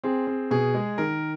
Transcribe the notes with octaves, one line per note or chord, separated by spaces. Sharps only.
C4 G#4
C4
B2 G#4
G#3
D#3 A#4